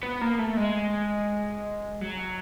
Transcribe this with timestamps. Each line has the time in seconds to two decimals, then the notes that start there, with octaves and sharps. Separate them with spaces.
0.03 B3
0.21 A#3
0.39 A3
0.57 G#3
2.01 F#3